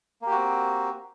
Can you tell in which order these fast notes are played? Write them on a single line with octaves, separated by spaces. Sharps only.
A#3 G4 F#4 C4